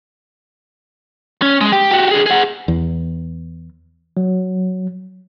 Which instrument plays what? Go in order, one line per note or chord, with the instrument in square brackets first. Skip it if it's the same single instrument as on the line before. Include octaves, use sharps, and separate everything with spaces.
[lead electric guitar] C#4
G#3
G4
F#4 G4
D3 G#4
G#4 F#5
[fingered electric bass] E2
[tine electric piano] F#3